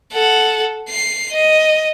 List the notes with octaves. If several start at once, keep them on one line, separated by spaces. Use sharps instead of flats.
A4 F#5
C7
D#5